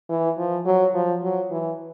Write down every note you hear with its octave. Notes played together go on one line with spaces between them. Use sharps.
E3
F3
F#3
F3
F#3
E3